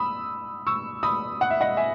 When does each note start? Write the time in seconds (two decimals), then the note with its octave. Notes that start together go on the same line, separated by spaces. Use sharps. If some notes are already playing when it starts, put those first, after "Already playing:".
Already playing: B5 D#6 E6
0.67 C#6 E6
1.03 B5 D#6
1.41 F#5
1.50 E5
1.61 D#5 F#5
1.77 E5 G#5